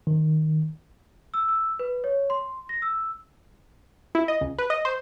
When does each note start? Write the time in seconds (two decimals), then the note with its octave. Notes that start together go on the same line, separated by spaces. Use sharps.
0.07 D#3
1.34 E6
1.49 E6
1.79 B4
2.04 C#5
2.30 C6
2.69 A#6
2.82 E6
4.15 E4
4.28 D#5
4.41 C#2
4.58 B4
4.70 D#5
4.85 C5